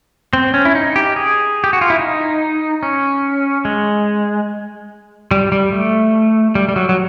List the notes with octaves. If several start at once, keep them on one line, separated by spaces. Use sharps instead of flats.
C4
C#4
E4
D#4
G4
G#4
G4
F#4
F4
E4
D#4
C#4
G#3
G3
G3
A3
G3
G3
F#3
F#3